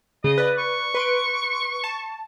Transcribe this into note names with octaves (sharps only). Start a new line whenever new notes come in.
C#3 D#5
B4 D5
C#6
B4 C6 D7
A5